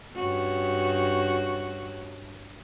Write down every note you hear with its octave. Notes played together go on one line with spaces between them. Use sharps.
G2 C#4 F#4